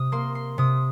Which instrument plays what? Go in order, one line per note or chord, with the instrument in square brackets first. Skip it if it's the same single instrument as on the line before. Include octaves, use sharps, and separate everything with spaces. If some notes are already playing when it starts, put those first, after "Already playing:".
Already playing: [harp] C3 D#6
A#3 C6
C6
C3 D#6